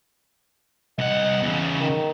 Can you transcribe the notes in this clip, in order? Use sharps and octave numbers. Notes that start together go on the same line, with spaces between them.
C2 D#5 F#5
E2 C#3
D#3